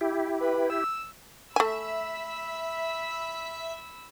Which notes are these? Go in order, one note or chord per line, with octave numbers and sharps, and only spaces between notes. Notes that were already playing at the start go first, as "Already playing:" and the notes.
E4 G4
B4
E6
A3 E5 G#5 B5 E6